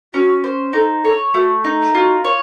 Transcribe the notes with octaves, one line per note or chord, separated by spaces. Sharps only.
C#4 F#4
C5
D#4 A4
A4 C#5
A3 F#4
D#4
F4 F#4
C#5